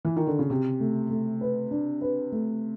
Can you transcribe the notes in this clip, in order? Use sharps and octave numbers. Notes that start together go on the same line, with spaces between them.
E3
D#3
D3
C#3
C3 G4
A3
A3
B4
D4
B4
A3